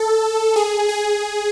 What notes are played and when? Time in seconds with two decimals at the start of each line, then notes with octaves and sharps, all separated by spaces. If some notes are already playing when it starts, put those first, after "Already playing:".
Already playing: A4
0.56 G#4
0.89 G#4